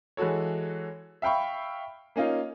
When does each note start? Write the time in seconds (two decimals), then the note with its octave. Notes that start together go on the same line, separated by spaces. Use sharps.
0.17 E3 G#3 F#4 A4 C#5
1.22 E5 F5 G5 B5 C#6
2.16 A#3 C#4 D#4 F4